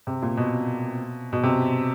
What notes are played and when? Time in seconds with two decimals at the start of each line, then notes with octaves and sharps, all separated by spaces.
0.07 C3
0.22 A#2
0.37 B2
1.33 B2
1.43 C3